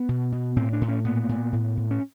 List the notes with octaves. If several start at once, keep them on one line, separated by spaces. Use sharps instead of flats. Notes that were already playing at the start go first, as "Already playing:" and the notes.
Already playing: B3
B2
B2
A2 C4
D4
A2
C#4
A#2 B3
A#2
A2
A2
C#4